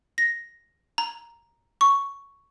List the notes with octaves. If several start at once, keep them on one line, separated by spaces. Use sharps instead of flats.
A#6
A#5
C#6